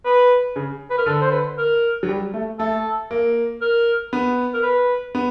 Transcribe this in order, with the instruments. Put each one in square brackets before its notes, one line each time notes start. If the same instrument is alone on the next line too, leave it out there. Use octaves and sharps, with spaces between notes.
[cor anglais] B4
[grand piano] C#3
[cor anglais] B4
A#4
[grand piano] D3 [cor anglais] A4
[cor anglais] C5
B4
A#4
[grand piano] F#3
G3
A3
[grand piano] A3 [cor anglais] A4
[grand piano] A#3
[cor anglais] A#4
[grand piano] B3
[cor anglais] A#4
B4
[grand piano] B3